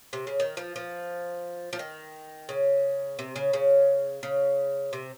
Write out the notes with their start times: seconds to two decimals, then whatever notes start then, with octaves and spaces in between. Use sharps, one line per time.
0.13 C3
0.27 C#3
0.40 D#3
0.57 F3
0.76 F3
1.73 F3
1.79 D#3
2.49 C#3
3.19 C3
3.36 C#3
3.53 C#3
4.23 C#3
4.93 C3